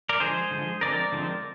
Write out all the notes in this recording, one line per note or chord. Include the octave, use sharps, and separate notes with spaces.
A#4 D5
D3 F3 G#3 G#4 C5
D3 F3 G#3
D3 F3 G#3 C4 A#4 D5
D3 F3 G#3 C4